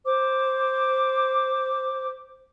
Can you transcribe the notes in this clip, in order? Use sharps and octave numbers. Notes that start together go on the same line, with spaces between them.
C5 D6